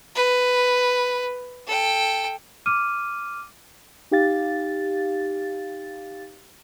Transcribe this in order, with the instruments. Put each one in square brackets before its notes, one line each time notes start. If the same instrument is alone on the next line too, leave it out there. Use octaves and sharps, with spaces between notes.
[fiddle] B4
A4 G5
[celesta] D6 F6 D#7
[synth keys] D#4 G4 F5 A6